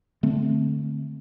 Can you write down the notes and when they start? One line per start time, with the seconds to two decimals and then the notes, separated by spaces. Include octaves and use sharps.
0.23 D3 A3 C4